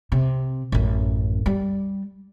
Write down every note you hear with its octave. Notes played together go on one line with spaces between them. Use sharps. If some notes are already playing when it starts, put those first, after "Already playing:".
C3
A1 F#2
G3